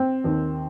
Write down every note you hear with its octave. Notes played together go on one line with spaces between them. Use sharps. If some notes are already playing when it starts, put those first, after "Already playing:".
Already playing: C4
D#2 D#3